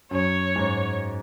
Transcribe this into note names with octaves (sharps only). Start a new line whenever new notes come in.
F#2 C#5
G#2